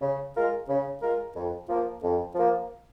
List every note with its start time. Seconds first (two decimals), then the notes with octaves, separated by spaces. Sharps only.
0.02 C#3
0.35 G#3 F4 A#4
0.68 C#3
1.02 G#3 F4 A#4
1.35 F2
1.69 F3 A#3
2.03 F2
2.35 F3 A#3